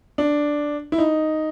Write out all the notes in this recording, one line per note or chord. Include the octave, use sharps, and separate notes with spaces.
D4
E4
D#4